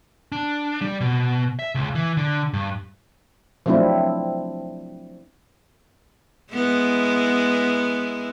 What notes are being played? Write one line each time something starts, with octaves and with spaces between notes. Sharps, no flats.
D4
G3
B2
E5
C#2
E3
D3
G2
F3 F#3 A3 C4 D4 E4
G#3 B3 E4